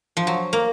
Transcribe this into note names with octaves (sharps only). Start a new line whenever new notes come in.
F3
F#3
A#3